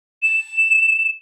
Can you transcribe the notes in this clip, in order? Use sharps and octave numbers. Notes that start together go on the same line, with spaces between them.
E7